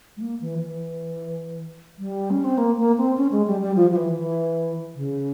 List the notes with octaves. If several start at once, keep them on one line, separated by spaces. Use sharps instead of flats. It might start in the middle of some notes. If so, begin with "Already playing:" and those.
G#3
A#3
E3
E3
G3
C#4
C4
A#3
A#3
C4
C#4
G#3
G3
G3
F3
F3
E3
E3
C#3